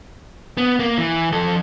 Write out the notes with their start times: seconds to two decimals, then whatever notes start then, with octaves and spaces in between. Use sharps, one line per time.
0.57 B3
0.79 A#3
0.98 E3
1.32 F3 A4